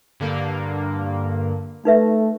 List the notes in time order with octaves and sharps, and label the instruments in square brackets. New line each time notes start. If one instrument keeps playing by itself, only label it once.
[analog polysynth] G2 D3 A#3
[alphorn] A3 [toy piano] D#4 B4 E5